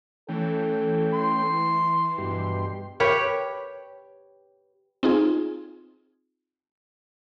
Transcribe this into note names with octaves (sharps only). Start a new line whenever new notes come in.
E3 A3 C#4 A4 G5
C6
G2 B2 G4 C6
G4 A#4 B4 C#5
C4 D#4 F4 G#4